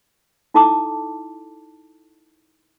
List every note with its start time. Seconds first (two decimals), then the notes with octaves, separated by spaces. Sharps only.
0.54 D#4 E4 A4 A5 D6 D#6